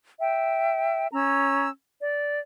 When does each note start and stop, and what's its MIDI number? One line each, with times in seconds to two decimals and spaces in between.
0.20 1.08 76
0.20 1.08 79
1.13 1.69 61
1.13 1.69 82
1.13 1.69 88
2.01 2.40 74